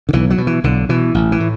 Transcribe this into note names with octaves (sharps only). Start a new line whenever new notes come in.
D3
B1 E3
F#3
B2
E3
B1 D3
B2 E3
A1
E3
A2